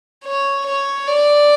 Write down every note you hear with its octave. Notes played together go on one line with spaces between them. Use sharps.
C#5
C#5
D5